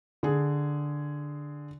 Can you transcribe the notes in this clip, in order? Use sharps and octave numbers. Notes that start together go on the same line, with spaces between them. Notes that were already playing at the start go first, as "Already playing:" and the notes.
D3 G#4